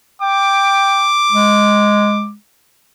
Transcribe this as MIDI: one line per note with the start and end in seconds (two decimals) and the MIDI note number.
0.22 1.09 79
0.22 2.30 86
1.32 2.34 56